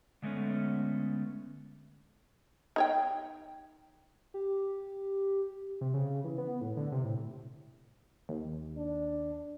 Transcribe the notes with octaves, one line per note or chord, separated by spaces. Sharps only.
D3 G#3 A3 B3 C#4
D#4 C#5 G5
G4
C3
C#3
E3
B3
A2
D3
C3
A2
D#2
D4